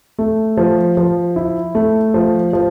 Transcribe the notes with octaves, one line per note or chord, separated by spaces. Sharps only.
A3
F3
F3
E4
A3
F3
F3